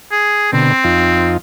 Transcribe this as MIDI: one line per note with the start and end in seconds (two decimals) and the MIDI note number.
0.12 0.50 68
0.53 0.72 47
0.53 0.72 50
0.53 1.33 60
0.84 1.37 41
0.84 1.37 63
0.84 1.37 65